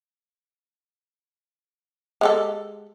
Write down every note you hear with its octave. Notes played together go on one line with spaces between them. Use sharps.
G#3 G4 A4